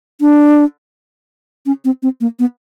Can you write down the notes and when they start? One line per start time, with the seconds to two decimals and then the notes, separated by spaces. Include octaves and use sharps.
0.21 D4
1.66 C#4
1.85 C4
2.03 C4
2.21 A#3
2.39 B3